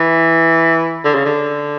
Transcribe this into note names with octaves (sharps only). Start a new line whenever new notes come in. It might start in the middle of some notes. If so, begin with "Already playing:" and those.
Already playing: E3
D3
C#3
D3